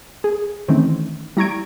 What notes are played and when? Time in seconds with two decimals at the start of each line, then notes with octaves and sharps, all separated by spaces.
0.24 G#4
0.68 D#3 E3 A3 C4 C#4
1.37 G3 E4 A#5 C#6 G#6 D7